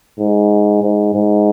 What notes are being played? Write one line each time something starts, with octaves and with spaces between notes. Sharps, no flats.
G#2
G#2
G#2